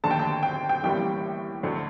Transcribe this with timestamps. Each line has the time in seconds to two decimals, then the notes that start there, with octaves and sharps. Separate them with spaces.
0.04 D#2 D3 A3 A5
0.11 G5
0.19 A5
0.43 G5
0.69 G5
0.83 A1 A2 G3 A#3 G5
1.63 D2 D3 A3